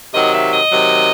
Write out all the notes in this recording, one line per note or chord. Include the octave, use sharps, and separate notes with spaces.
C3 D#3 F#3 D#5
E5
D#5
C3 D#3 F#3